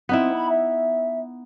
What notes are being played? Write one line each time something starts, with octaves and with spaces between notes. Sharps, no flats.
B3 C4 D#4 E4
B5
E5